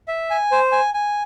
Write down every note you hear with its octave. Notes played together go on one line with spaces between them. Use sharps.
E5
G#5
C5
G#5
G#5